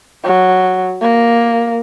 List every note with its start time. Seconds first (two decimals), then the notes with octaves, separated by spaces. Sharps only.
0.24 F#3
1.02 A#3